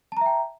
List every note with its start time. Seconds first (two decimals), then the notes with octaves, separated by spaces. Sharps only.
0.12 A5
0.17 A#5
0.21 E5
0.26 G5